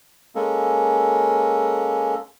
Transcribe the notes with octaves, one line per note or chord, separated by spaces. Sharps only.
G#3 A#3 C#4 A4